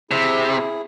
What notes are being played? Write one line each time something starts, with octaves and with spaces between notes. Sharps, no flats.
C3 E4 G#4